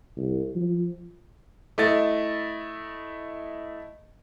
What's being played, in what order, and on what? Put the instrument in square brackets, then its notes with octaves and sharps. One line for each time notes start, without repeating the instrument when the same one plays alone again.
[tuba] C2
F3
[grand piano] A3 E4 D#5 A6